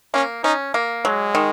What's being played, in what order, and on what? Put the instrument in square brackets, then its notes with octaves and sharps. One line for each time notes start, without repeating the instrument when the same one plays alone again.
[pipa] A#3 [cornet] C#4
[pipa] C#4 [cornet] D#4
[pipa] A#3
[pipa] F#3 [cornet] G#3
[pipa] D#3